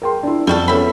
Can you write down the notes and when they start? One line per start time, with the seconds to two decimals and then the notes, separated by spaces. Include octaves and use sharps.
0.02 A#4 G5 C6
0.23 D4 E4
0.47 F2 G3 F#4 A4
0.68 B3 C#4 A4 E5 B5